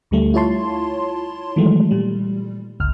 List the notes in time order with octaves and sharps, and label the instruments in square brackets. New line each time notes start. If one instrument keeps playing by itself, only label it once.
[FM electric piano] D2 D3 G3 A3
E4 F4 C#5 A5 C6
D#3 E3 F#3 G#3 A3
A#2 G3
G1 C#2 F6